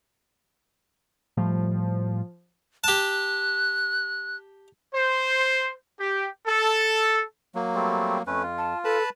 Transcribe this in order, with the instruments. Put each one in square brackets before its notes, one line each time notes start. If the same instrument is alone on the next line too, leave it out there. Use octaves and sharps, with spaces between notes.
[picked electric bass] A2 G3 A3 [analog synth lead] F3
[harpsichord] G4 A5 [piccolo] F#6
[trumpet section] C5
G4
A4
[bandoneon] F#3 A#3
[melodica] G3 A3 C4
[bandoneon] F2 [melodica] A3 C#4 B4
[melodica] F4
[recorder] A5
[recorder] A4 [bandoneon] B4 A5 B5